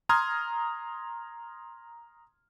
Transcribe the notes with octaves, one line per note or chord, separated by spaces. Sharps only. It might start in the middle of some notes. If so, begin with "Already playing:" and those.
A#5 C6 D#6 F6 G#6